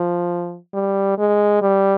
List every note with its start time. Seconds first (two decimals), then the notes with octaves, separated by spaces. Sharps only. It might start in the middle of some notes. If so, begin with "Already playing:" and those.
Already playing: F3
0.74 G3
1.18 G#3
1.62 G3